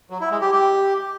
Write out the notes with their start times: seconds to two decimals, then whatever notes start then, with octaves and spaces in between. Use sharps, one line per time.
0.10 F#3
0.21 E4
0.31 G#3
0.41 G4
0.52 G4